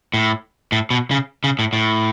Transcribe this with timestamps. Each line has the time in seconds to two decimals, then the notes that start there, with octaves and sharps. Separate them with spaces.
0.14 A2
0.72 A2
0.90 B2
1.11 C#3
1.44 C#3
1.59 A2
1.73 A2